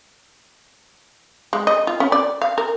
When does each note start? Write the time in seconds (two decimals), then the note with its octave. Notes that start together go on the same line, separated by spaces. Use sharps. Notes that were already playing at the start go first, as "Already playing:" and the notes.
1.53 G#3
1.67 D#5
1.87 F4
2.00 C#4
2.12 D5
2.42 F5
2.58 A#4